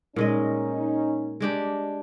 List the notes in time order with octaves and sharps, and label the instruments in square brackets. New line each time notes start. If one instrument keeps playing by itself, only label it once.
[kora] A#2 G#3 D#5 [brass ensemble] C#4 D#4
[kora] G#3 D4 G4